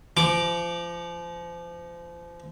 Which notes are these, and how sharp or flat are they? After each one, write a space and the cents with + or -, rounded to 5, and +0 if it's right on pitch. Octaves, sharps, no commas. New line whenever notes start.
F3 -30 D6 +0